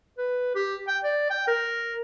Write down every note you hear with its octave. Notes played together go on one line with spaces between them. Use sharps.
B4
G4
G5
D5
G5
A#4